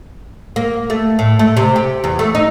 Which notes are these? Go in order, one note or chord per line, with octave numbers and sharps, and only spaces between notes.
A#3
A3
A2
A3
C3
G4
E2
A3
D#4